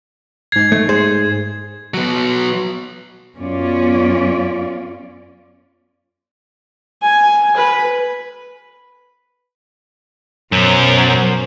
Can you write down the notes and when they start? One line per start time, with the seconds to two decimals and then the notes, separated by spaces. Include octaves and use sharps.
0.52 G#2 G#6 C7
0.72 A3
0.89 G#4 C5
1.94 F#3 B3
3.36 F#2 B3 C#4 F4 D5
7.02 G#5
7.57 B4
10.52 F#2 B2 C5